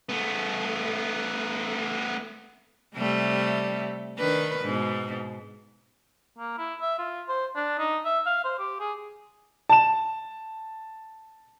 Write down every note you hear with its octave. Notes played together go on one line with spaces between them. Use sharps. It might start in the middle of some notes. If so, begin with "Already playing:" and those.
A3 B3
C3 G3 A3
D#3 D4 B4
G#2 B2
A#3
E4
E5
F4
C5
D4
D#4
E5
F5
C5
G4
G#4
A5 E7